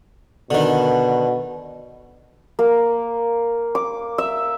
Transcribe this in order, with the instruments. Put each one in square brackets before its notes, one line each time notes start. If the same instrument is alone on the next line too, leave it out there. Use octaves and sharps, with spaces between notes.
[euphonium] B2 [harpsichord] D3 D#3
[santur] A#3
D6
E5